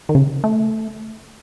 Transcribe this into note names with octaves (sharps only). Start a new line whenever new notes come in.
D#3
C#3
A3